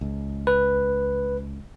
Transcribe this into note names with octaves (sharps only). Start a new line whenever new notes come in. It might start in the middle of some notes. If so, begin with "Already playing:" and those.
C#2
B4